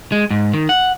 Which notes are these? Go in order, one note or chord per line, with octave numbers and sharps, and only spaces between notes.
G#3
G#2
D#3
F#5